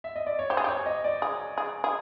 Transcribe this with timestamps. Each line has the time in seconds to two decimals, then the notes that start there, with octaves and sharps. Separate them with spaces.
0.04 E5
0.16 D#5
0.26 D5
0.39 C#5
0.50 G4 C5
0.57 G#4
0.64 G4 C#5
0.86 D#5
1.04 D5
1.22 G#4
1.58 G#4
1.84 G#4